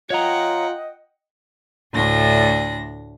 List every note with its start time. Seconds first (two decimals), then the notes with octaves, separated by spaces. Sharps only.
0.10 F4 C#5 D#5 F#5 G5 A#5
1.93 D2 A2 D4 A#6